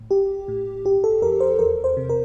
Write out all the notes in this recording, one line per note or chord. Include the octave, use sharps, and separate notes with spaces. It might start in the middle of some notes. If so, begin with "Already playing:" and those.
Already playing: A2
A1 G4
A2
G1 G4
A4
F2 A#4
C5
E2 A#4
C5
C3
A#4